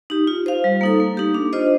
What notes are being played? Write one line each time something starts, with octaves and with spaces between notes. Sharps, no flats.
D#4 G4
F4
C5 F5
G3
A#3 D#4 A4
A#3
D#4 G4
D4
F4 C5 D#5